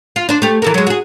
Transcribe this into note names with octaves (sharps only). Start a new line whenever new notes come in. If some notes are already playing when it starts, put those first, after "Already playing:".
F4
D4 C5
A3 G4
E3 A4 A#4
F#3 G#3
F#4 G#4